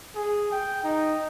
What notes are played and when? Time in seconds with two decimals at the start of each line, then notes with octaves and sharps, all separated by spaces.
0.16 G#4
0.52 G5
0.84 D#4